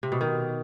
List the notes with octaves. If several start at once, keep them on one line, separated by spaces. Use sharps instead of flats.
C3
B2
D#3